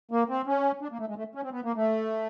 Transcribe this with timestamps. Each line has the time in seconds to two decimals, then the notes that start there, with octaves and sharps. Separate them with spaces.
0.11 A#3
0.29 C4
0.47 C#4
0.82 D4
0.92 A#3
0.99 A3
1.08 G#3
1.17 A3
1.35 C#4
1.43 C4
1.52 B3
1.64 A#3
1.76 A3